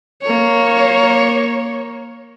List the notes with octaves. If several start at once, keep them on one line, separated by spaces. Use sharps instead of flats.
A#3 C#5